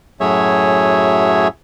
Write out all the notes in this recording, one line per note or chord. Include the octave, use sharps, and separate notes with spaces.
F#2 A2 F#3 G#4 C#5 E5